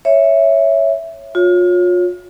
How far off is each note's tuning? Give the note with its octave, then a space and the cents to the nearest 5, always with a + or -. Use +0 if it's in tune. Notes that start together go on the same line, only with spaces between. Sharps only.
C#5 +0 E5 +0
F4 +35 C#5 +0